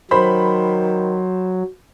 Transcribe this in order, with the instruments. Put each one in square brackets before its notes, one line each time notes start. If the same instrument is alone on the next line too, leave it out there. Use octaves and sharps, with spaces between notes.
[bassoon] D#3 [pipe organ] F#3 [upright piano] C5 B5